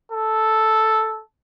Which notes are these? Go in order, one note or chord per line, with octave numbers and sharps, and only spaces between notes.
A4